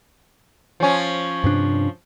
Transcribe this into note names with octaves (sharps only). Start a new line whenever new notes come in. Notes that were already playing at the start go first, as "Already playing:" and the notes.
F3 C#4
G2 C3 D4